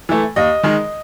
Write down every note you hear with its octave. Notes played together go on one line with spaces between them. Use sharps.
E3 A3
D#2 D#5
D#3 G#3